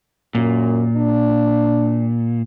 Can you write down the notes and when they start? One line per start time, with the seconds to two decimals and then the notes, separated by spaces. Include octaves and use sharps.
0.35 F#2 A#2
0.97 D4